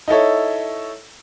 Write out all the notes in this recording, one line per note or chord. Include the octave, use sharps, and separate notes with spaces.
D#4 E4 A4 C#5